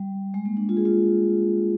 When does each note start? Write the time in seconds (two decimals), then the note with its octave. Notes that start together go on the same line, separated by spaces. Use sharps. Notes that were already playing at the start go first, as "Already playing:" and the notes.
Already playing: G3
0.34 G#3
0.45 A#3
0.57 D4
0.69 F4
0.77 G#4
0.85 F4